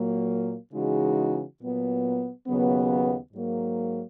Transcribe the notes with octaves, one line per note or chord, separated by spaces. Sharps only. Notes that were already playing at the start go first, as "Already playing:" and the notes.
Already playing: A#2 F#3 A#3
C#3 E3 G#3 D#4 F#4
A#2 F#3 B3
D#2 C#3 F#3 B3
G#2 F#3 A#3